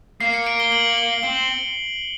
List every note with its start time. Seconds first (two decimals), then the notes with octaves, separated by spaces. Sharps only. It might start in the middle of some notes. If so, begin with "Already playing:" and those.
0.20 A#3 C7
0.34 C#7
0.47 D7
0.60 G7
0.72 F#7
0.98 G7
1.23 C4 F#7